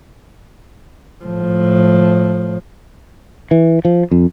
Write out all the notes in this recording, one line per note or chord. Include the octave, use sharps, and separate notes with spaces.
A2 F3
E3
F3
F2